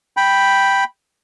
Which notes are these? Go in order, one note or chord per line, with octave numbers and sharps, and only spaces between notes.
G5 B5